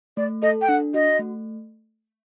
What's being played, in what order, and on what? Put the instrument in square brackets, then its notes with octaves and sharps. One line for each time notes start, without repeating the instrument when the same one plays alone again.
[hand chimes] A3 [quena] D5
[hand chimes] A4 [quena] D#5
[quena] G5
[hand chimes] D4 [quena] F#5
[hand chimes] F#4 [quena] D#5
[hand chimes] A3